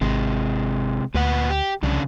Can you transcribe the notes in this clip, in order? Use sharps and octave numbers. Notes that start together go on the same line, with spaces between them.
G#1 C3 G#3
D2 A#2 B4 F#5
G4
C2 F2 C#3 D4